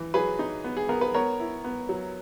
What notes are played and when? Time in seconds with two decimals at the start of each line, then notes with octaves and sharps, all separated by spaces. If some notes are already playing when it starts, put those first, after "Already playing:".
Already playing: E3
0.14 F#3 G#4 B4
0.39 D#4
0.64 B3
0.77 G#4
0.89 B3 A#4
1.01 B4
1.14 B3 A#4 C#5
1.40 E4
1.64 B3
1.89 F#3